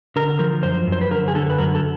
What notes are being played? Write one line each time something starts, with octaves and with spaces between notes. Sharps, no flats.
D3 A#4
F3 A#4
F#2 C5
F#2
C5
B4
D3 A#4
G#4
D3 A4
B4
F#2 A#4
A4